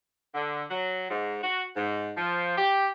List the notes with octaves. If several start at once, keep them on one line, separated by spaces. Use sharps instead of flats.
D3
F#3
G#2
F#4
G#2
F3
G4